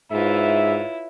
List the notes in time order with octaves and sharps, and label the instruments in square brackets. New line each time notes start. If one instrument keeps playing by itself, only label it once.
[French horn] G#2 [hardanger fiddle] E4 [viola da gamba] F4 B4 C#5 [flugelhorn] E5